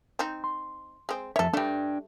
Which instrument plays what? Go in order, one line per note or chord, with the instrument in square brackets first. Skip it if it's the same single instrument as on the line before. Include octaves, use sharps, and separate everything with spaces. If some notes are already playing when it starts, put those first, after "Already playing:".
[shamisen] C4 D#4
[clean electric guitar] C6
[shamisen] G#3 C4
[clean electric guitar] F2 E5 [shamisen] A4 C#5
[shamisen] G3 A3 [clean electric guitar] D4 G5